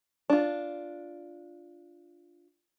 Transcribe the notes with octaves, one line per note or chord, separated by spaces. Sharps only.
D4 F4